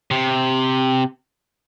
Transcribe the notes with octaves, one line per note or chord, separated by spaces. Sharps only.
C3